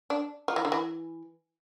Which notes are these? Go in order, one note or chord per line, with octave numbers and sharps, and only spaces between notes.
D4
F3
E3
D3
E3